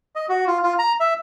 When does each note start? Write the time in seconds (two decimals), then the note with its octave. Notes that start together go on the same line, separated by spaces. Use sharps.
0.16 D#5
0.29 F#4
0.47 F4
0.63 F4
0.79 A#5
1.00 E5